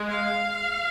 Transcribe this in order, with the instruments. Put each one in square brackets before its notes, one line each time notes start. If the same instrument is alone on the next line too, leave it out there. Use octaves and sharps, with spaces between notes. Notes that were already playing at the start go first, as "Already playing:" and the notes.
Already playing: [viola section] G#3
F5